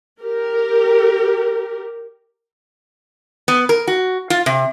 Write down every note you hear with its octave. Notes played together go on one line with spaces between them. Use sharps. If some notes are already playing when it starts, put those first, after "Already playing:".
G4 A#4
B3
A#4
F#4
F4
C3